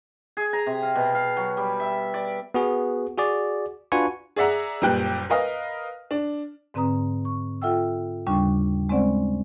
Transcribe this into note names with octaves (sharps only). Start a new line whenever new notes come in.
G#4
A#5
C3
F5
B2
F5
F#3
G3
E5
D5
B3 F#4 G#4
F#4 G#4 D5
D4 F4 F#4 B4 G#5 C#6
G#4 D5 E5 F#5 A#5
F#1 A#2 G3 B4 G5 F#6
A#4 B4 D#5 F5
D4
G#2 D3 C4 B4 A#5 D#6
C#6
F4 A4 E5 F#5 G5 E6
D#2 C#3 G3 D4 C#6
G#3 C4 C#4 C5 D5 F#5